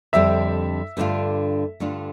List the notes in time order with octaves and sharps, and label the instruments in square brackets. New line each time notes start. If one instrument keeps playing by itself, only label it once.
[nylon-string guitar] F2 D3 G3 C4 [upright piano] E5
[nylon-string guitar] G2 D3 A3 D4 F4
G2 D3 A3 D4 F4